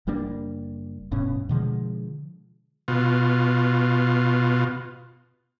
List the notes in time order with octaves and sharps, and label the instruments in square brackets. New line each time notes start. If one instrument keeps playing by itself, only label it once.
[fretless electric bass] F#1 G3 A#3 D4
D1 G2 B2 C#4
B2 D3 F3 G#3
[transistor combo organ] B2 F4